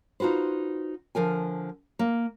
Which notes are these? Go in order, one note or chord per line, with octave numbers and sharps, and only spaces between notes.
D#4 F4 F#4 B4 C5
D3 F3 A#4 G#5
A#3